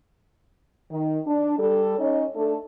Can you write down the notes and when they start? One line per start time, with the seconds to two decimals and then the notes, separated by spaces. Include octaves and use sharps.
0.91 D#3
1.26 D4
1.58 G3 A4
1.98 C#4 D#4 C#5 D#5
2.36 A3 D4 A4